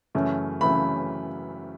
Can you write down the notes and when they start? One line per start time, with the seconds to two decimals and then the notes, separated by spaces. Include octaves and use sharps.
0.15 F#2 C#3 E3 A3
0.61 F#2 C#3 E3 A3 B5